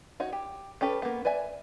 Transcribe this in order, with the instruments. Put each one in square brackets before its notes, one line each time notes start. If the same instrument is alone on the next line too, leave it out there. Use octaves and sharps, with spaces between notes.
[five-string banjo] D#4 F#4 C#5
G4
C#4 G4 A4 B4
A#3 B3
B4 D5 E5 G#5